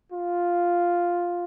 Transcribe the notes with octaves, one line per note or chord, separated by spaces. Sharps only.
F4